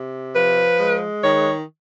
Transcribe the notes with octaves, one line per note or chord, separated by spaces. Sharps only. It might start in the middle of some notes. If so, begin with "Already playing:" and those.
Already playing: C3
F3 B4
G#3
D#3 C#5